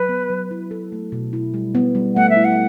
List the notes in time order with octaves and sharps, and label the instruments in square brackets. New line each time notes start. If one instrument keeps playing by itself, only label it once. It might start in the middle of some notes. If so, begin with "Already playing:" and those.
Already playing: [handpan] F#3 [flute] B4
[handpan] B3
F#3
E4
A4
A3
B2
E4
G3
B3
G3
[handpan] A3 [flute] F#5
[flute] E5
[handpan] E4
[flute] F#5